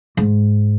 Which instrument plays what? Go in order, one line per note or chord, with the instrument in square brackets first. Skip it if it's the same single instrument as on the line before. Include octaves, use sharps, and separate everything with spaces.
[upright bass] G#2